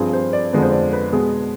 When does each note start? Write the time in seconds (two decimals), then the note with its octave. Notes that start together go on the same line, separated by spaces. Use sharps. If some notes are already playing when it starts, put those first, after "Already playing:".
Already playing: G2 F3 C4 G#4
0.13 C5
0.33 D5
0.53 F2 D3 F3 G#3 B3
0.62 C5
0.72 D5
0.93 B4
1.12 B2 G#3 B3 G#4